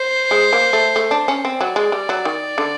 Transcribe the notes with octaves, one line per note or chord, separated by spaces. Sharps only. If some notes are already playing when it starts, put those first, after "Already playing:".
Already playing: C5
G#3
A#3
A3
A3
D4
C#4
C4
F#3 D5
G#3
G3
F#3
D#3
D3